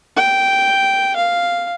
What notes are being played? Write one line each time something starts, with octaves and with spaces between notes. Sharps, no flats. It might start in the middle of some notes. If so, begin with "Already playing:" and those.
G5
F5